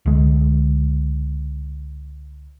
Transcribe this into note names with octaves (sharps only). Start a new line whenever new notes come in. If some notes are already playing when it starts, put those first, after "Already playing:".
C#2 D3 G#3